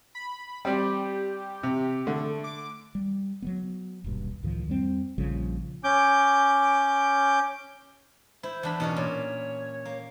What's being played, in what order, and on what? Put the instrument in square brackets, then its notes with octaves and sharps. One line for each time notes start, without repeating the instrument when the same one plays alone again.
[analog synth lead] B5
[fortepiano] G3 C4 D5 [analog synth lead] G4
[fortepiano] C3
[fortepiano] D3 [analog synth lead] A3
[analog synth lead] D6
[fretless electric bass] G3
F#3 G3 B3
D#1 B1 G2
C#2 A2 D#3 F3
F2 G3 C4
A#1 C#3 F3 G3
[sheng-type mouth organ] C#4 D6 G6
[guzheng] E4 [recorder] C5
[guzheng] E2 D4 B5
[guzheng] B2 C#4 A#4 [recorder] D#4
[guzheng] A#2 [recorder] C#5
[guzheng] A#3